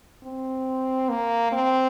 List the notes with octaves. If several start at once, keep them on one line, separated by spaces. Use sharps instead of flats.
C4
A#3
C4